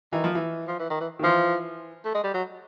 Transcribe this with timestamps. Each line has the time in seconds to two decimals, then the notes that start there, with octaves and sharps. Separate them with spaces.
0.13 D#3 E3
0.24 F3
0.35 E3
0.68 F3
0.79 E3
0.90 D#3
1.00 E3
1.19 D#3
1.23 E3 F3
2.05 A3
2.15 G#3
2.24 G3
2.34 F#3